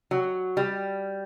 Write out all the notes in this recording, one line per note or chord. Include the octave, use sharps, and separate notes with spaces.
F#3
G3